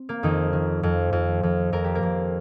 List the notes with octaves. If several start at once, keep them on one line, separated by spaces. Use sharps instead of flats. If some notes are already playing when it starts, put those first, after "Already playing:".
Already playing: C4
A#3
F2 D#3 D#4
D#3
F2
F2
F2
F2 A#4
G4
A#3 A#4
F2